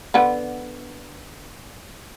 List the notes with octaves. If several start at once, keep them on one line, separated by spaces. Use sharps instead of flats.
D3 B3